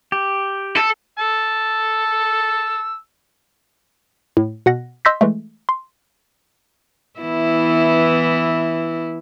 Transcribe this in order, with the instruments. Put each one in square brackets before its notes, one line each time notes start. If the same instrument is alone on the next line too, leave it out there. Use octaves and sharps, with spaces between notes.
[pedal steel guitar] G4
[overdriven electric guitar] A4
[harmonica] A5 E6
[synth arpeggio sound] A2
B2 F#5 A#6
D#5 C6 E6 G6 A#6 B6
E3 G#3 A3
C6
[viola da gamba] E3 B3 E4